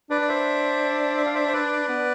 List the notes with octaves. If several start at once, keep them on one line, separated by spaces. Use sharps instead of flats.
D4 B4 D5
D5
C5 E5
E5
F5
C5 E5
C5
B4 D5
B3